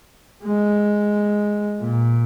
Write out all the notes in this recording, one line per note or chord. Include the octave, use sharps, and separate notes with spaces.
G#3
A#2